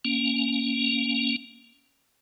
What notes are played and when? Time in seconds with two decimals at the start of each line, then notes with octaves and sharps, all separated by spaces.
0.05 A#3 C#4